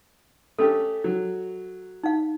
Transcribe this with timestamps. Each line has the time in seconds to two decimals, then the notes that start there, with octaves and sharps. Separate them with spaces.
0.59 A3 C#4 G4 A4
1.04 F#3
2.04 D#4 F5